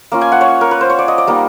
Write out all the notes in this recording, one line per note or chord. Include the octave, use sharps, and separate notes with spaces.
A#3 C#4 F4
G#5
F#5
C#5
A#4
B4
C5
C#5
D5
D#5
D5
G3 A#3 D#4